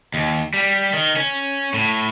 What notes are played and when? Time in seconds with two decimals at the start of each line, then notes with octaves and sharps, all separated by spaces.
0.14 D#2
0.54 G3
0.94 D#3
1.16 C#4
1.74 A2